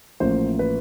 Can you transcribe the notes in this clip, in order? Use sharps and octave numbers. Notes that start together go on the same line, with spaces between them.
A1 A2 F3 A#3 C5
B4